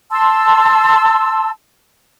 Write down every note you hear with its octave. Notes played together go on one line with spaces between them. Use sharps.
A5 C6 E6